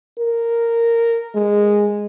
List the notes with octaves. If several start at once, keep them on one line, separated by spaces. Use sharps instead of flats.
A#4
G#3